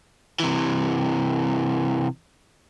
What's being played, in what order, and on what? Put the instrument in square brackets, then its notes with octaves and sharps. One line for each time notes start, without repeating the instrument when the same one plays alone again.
[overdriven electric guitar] C3 E3